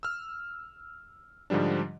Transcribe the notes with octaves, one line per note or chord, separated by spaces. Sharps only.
E6 F6
G#2 D3 F3 G3 D4